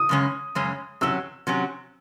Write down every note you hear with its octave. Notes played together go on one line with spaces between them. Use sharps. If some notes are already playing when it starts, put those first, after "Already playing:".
Already playing: D#6
F#2 C#3 G#3 C#4
F#2 C#3 G#3 C#4
C3 F#3 C#4 E6
C3 F#3 C#4